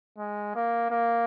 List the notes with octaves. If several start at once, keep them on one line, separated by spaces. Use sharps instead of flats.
G#3
A#3
A#3